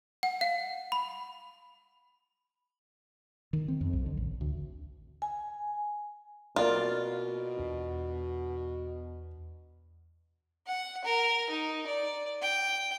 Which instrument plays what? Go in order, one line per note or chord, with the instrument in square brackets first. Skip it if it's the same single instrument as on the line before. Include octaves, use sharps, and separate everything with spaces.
[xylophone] F#5
F5
B5
[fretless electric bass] D#3
C4
F2
B1
D3
A1
D2
[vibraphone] G#5
[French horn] B2 [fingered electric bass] A#3 C4 [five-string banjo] F4 [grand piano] A#4 D5
[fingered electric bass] E2 D4
[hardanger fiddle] F#5
A#4
D#4
D5
G5